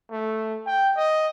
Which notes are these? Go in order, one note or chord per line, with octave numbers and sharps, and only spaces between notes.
A3
G5
D#5